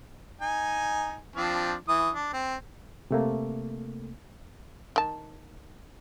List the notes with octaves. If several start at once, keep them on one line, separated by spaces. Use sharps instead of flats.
D#4 G#5
F3 C4 D4
E3 D#6
D4
C4
C3 A3 A#3
D#3 A5